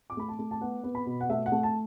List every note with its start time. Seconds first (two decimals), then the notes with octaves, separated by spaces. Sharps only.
0.10 D6
0.17 A3 B5
0.28 A5
0.39 A3
0.51 A5
0.61 B3 F#5
0.84 B3
0.95 B5
1.06 B2
1.21 F#5
1.30 A3 E5
1.46 F#5
1.52 A3
1.63 A5